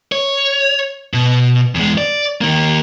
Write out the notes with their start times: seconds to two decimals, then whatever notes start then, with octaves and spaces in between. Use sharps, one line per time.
0.12 C#5
1.14 B2
1.75 E2 G#3
1.98 D5
2.41 D#3 A#3